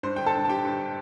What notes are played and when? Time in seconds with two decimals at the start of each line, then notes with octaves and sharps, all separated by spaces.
0.03 G2 C5
0.16 D3 G5
0.26 A4 A5
0.34 G2
0.45 A5
0.49 D3 G4 G5
0.65 G2